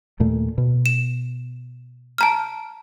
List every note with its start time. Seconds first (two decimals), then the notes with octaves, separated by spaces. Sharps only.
0.20 D#2 A#2 A3
0.58 B2
0.86 E7
2.18 A5 A#5 F6